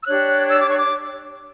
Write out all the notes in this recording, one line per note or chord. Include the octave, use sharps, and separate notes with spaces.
E6
D4 G4 C#5 F#6
E6
D6
C#6
D6